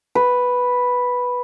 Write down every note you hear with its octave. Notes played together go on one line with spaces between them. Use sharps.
B4